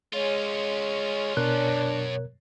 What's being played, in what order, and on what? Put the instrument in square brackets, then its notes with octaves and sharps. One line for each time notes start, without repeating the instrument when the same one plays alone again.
[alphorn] G#3 [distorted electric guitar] C#4 F4 [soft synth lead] C#5
[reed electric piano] B2 A#4 F#6 [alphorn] D4
[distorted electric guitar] F#2